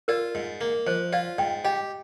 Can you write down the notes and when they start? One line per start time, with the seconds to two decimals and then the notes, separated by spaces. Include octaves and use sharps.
0.08 F4 A#4 D5
0.35 G#2
0.61 A#3
0.86 F3 C5 D#5
1.13 F4 D5 F5
1.38 G#2 D#5 G5
1.64 G4 D#5 G5